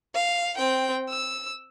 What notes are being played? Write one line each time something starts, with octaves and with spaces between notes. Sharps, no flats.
F5
C4 G5
E6